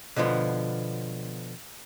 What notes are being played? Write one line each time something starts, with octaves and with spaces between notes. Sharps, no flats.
B2 D3 F3 B3